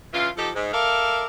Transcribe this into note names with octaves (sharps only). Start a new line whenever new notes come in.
C#3 E3 F4
F3 D#4 G4 A4
G#2
A4 A#4 D5 E5 F5